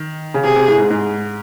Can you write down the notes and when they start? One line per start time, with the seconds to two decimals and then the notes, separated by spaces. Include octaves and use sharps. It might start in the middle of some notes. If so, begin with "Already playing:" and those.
Already playing: D#3
0.34 C#3
0.44 C3 G#4
0.56 C3
0.68 A2
0.78 G#2
0.90 G#2